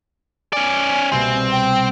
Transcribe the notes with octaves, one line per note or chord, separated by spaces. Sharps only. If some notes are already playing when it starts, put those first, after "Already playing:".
C#4 D5 G#5
C2 B2 A#3 C4
G5